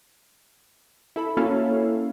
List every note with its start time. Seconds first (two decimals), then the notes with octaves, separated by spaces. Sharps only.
1.16 E4 A4 B5
1.37 A#3 C#4 E4 F#4 A4 F5